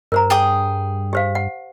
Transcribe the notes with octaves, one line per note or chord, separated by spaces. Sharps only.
G2 A#4 C5 A#5
G#4 G5 D#6
G4 C5 F5
F#5